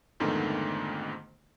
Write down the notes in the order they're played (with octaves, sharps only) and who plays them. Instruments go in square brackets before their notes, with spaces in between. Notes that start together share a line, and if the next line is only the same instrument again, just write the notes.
[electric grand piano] F2 G#2 D3 D#3 A3 B3